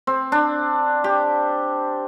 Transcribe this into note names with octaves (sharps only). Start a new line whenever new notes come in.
C4
D4
G4